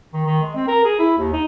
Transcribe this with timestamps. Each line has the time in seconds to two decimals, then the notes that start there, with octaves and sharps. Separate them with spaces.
0.13 D#3
0.26 D#3
0.42 G#3
0.55 C4
0.68 A#4
0.84 G#4
0.99 E4
1.18 D#2
1.33 D#4